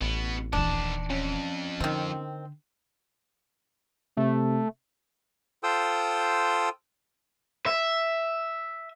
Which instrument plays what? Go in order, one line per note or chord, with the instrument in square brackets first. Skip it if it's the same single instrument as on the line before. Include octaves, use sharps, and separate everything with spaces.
[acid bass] A1 [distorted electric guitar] B2 B3
[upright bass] D#1 E3 [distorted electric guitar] D#3 A5 [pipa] D4
[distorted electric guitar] F2 [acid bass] C#4
[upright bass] D3 [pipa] D#3 C4
[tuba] C3 [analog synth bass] A3
[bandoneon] F4 A4 C5 G5 D#6 E6
[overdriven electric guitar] E5